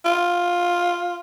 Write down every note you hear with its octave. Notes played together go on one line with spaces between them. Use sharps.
F4